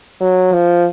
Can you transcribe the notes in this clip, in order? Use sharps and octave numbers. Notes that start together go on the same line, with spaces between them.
F#3
F3